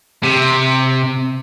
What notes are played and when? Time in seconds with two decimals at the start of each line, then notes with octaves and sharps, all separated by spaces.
0.23 C3